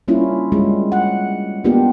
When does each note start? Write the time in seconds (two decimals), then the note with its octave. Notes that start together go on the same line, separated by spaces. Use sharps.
0.08 G3 A#3 C#4 D4 E4 F4
0.52 G3 G#3 C#4 F4
0.92 F#5
1.64 A#3 B3 D4 F4 G4